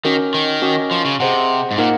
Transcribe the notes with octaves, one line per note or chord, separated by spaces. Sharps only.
D#3 C#4 F#4 A#4
D#3
C#4 F#4 A#4 D#5
F3
C#3
C3 G#4 C5 D#5 F#5
G#2
A#2 A#3 D#4 A#4 D#5 F#5